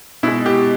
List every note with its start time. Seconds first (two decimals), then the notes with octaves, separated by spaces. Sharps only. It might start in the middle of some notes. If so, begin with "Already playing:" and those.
0.23 B2 E4
0.27 G#3
0.46 G4